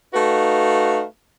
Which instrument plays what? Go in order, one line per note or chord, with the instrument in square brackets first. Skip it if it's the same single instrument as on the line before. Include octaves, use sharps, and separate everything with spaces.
[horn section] A3 D#4 F#4 B4 F5